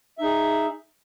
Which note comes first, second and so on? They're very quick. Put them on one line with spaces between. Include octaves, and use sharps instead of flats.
E5 D#4 G#4